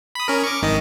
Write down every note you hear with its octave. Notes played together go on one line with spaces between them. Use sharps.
B5 D#6
C#4 A#4
C#6 D6
G#1 D#3 D#5